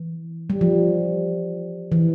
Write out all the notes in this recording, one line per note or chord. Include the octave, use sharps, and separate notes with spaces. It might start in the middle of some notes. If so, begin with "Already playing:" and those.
Already playing: E3
G3
F3
E3